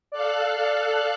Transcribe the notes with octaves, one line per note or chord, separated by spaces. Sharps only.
A4 D5 F5 F#6